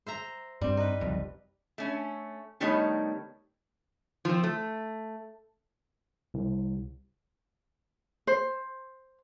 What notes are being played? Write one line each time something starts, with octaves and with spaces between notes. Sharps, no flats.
C5 E5 A#5
G2 G3 C4
D#4 B4
F#1 C2 F2
A3 C#4
D#3 G3 A3 B3 D#4 C#5
F3 C4
A3
C2
C5